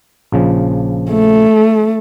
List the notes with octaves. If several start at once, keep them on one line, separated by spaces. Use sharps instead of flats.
A#1 C#3 F3
A3